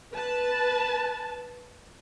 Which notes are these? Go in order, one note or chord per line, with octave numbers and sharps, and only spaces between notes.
B4 A5